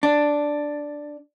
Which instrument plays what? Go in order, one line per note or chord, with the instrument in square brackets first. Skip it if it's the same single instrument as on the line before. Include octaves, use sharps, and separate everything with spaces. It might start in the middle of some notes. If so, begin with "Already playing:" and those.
[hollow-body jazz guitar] D4